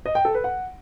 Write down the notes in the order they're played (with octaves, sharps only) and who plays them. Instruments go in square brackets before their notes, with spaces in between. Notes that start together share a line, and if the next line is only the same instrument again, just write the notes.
[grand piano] D#5
G5
A4
B4
F#5